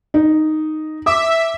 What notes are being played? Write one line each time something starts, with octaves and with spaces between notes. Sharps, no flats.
D#4
E5 D6